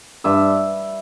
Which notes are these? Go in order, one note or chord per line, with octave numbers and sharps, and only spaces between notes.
G2 E5